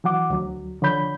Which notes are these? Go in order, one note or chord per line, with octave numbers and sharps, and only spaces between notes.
E3 F#3 F#5 D6
D2 F#3
D3 F3 C#5 B5 G6